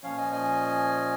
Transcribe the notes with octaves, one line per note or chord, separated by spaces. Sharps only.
A#2 F3 C#4 C#5 F5
D#5 G#5
D#5 G#5